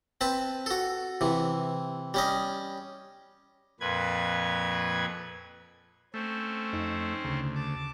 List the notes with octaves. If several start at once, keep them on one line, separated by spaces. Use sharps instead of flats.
C4 B4 A5
F#4 A4
C3 E3
G3 C#4 D#5
F2 A#2 B4 G#6
A3 C4 C#4 C5
F2 D#4
D2 C#3
A5 D6